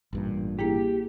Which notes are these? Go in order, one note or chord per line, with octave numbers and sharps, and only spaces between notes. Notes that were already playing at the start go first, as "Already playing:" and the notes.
A1 G2 A#2
A#3 E4 G4 G#4